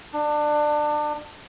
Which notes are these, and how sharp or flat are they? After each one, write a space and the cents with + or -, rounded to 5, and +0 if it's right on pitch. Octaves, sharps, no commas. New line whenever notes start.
D4 +25